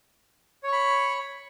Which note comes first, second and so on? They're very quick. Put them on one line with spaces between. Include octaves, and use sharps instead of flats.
C#5 C#6 B5